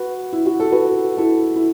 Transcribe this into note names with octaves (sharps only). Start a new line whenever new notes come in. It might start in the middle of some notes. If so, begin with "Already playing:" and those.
Already playing: F#4 B4
E4
F#4
A4
F#4 B4
E4 A4
E4